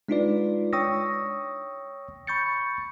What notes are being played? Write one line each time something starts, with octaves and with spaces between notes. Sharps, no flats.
G#3 D4 D#4 F4 B4 D5
C#5 G5 C#6 D#6 E6 A#6
B5 C#6 G6 A6 C#7